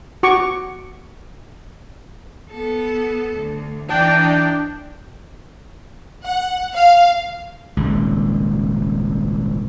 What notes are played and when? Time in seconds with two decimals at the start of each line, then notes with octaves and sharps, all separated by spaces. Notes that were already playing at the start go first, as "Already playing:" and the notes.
0.23 F#4 C#6 D6
2.51 B3 A4
3.36 D2
3.90 E3 D4 D#4 G5
6.25 F#5
6.74 F5
7.77 D#1 G#1 C#2